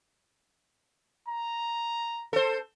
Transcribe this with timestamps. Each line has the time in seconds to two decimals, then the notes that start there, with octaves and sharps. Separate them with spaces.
1.28 A#5
2.33 A4 C5